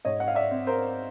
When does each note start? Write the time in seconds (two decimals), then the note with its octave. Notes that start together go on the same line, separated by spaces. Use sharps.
0.05 G#2 C#5 D#5
0.20 F#5
0.28 F5
0.35 D5 E5
0.51 C4
0.67 A#4 C5